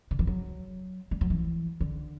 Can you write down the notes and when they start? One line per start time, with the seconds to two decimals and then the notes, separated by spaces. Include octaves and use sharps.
0.11 D3
0.19 E3
0.27 F#3
1.11 G3
1.21 F#3
1.30 E3
1.81 D3